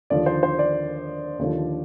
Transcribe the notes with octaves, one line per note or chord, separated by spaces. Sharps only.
D#2 D3 F3 D5
C5
C5
D5
D#2 D3 F3